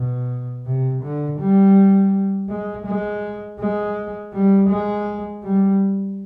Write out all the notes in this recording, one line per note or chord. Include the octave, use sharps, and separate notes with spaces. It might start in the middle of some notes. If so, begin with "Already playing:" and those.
Already playing: B2
C3
D3
G3
G#3
G#3
G#3
G3
G#3
G3